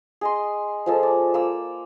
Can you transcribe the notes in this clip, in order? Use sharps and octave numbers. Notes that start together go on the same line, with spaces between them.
G#4 D#5 C6
F3 G#3 A4
D5
A#3 E6